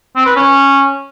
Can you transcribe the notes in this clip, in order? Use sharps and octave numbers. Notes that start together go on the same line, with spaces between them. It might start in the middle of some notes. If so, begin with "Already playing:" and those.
C4
B4
C#4